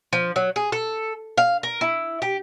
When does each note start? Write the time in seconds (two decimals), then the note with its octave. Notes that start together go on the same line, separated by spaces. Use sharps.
0.13 F3
0.36 F#3
0.56 G#4
0.72 A4
1.38 F5
1.63 A#4
1.81 E4
2.22 G4